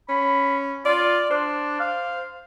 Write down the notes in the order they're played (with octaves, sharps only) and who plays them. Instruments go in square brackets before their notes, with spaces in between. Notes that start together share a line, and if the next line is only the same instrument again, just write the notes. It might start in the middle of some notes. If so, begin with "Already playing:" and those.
[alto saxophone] C#4 [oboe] B5
[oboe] F4 [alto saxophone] D5
[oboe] D4 [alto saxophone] C5
[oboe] F5